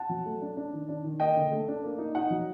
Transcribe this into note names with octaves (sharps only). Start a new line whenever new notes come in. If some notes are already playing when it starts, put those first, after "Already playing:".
Already playing: F#5 A5
F#3
A3
D4
D4
D#3
D4
D#3
A#3 D#5 G5
D3
A3
D4
A#3
D#4
D#4 F#5
F#3